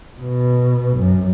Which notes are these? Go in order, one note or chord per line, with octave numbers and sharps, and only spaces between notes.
B2
F#2